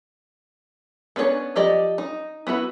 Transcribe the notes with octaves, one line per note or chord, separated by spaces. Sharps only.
B3 C#4 D4 A4 C#5
F3 G4 D5 D#5
D#4
B3 E4 F#4 B4